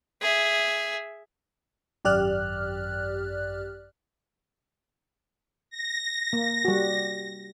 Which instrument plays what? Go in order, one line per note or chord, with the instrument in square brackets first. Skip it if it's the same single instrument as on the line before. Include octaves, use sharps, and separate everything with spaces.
[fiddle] G#4 E5
[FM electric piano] G#1 F#2 G4 D5 F6 F#6
[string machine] A#6
[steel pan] A#3
G3 F#4